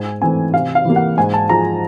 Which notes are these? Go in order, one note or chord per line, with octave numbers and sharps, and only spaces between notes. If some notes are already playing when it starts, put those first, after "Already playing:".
Already playing: G#2 G#5
E3 A3 C4 G#5
C3 F5
F5
E3 G3 A#3
F#5
G#2 G#5
A5
F3 G#3 A#5